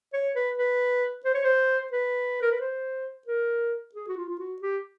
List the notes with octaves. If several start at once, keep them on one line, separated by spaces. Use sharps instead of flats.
C#5
B4
B4
C5
C#5
C5
B4
A#4
B4
C5
A#4
G#4
F#4
F4
F4
F#4
G4